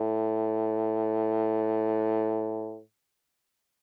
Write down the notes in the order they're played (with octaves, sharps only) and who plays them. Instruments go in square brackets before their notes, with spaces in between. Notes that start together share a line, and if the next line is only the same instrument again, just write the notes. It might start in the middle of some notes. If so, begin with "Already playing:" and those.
Already playing: [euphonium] A2